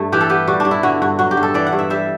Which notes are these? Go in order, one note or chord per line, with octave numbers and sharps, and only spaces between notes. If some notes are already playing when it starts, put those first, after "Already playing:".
Already playing: G2 A3
E3 G4
A4
B3 G4
G3 F#4
D4
G2
E4
D3 F#4
G2 F#4
F#3 F#4
G4
G2
A4
E3 D5
F#5
G2
E5
G3 E5